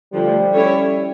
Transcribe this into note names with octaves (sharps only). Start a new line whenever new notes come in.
D3 F3 G3 A3
C#4 E4 A4 C#5